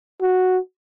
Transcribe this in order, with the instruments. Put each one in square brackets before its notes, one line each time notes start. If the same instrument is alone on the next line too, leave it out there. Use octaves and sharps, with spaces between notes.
[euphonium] F#4